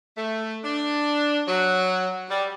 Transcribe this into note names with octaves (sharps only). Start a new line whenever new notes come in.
A3
D4
F#3
G3